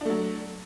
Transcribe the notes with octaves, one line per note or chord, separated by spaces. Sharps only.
F#3 A3 D4